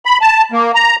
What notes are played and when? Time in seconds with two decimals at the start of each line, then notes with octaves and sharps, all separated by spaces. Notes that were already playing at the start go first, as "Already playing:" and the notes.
0.05 B5
0.21 A5
0.52 A#3
0.75 A#5